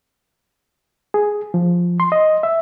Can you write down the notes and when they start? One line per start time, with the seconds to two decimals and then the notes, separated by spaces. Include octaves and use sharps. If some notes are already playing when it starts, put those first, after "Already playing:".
1.14 G#4
1.54 F3
2.00 C6
2.12 D#5
2.43 E5